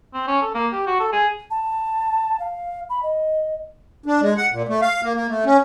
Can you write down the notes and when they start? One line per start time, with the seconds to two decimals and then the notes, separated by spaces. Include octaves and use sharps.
0.14 C4
0.27 C#4
0.42 A4
0.54 A#3
0.73 G4
0.87 F#4
1.00 A4
1.13 G#4
1.51 A5
2.40 F5
2.90 B5
3.03 D#5
4.06 D4
4.21 G#3
4.37 F#5
4.52 A#2
4.68 A3
4.82 F5
5.03 A#3
5.14 A#3
5.28 A3
5.45 C#4